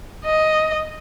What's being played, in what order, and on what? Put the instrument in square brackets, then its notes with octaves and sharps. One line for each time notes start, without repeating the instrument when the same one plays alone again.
[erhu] D#5